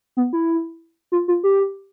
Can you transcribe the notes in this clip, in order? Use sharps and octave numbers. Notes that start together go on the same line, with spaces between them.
B3
E4
F4
F4
G4